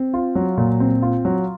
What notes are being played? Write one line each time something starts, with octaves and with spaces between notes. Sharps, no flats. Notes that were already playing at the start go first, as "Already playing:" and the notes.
Already playing: C4
F4
F#3
A#2
C4
F4
F#3